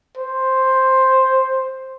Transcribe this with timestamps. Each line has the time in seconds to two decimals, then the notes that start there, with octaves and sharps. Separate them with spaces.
0.18 C5